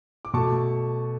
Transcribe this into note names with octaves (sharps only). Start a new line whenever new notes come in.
D6
B2 A3 A5 C#6